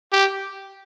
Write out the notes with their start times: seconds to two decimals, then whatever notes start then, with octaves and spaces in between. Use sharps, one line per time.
0.12 G4